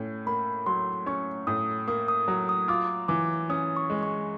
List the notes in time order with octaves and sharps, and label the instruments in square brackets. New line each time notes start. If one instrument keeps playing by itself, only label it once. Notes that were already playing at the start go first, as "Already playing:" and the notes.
Already playing: [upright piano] A2 C#4
[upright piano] A#3 [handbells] B5
[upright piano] F#3 [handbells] C6
[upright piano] C#4 [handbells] C#6
[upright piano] A2 [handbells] D#6
[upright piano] A#3 [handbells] D#6
[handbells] D#6
[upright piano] F#3
[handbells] D#6
[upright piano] F4 [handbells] D6
[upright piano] E3 [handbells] D6
[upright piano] C#4 [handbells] D#6
[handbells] C#6
[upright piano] G#3
[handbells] C#6